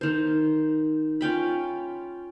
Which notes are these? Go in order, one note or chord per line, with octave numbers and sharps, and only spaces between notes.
D#3 C5
C#4 F4 G5 B5